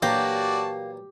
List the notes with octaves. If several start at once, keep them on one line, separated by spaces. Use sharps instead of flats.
A#2 E3 F#3 A#3 F#4 G4 D5 A5